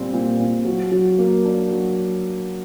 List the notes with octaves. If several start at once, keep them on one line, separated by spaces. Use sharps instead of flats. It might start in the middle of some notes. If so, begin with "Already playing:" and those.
Already playing: A#2 G3 C4
A#2
A#2
F#3
F#3
A#3
D4
F#3